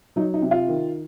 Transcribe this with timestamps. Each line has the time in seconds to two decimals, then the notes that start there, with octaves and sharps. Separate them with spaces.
0.16 F#3 D#4
0.34 D#4
0.42 C3
0.51 F4
0.68 D#3